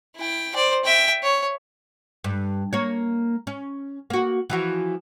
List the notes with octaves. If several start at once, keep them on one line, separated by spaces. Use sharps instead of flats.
E4 G5
C5 D5
E5 G5
C#5
G2
A#3 C#5
C#4
A#3 F#4
E3 F3 F#4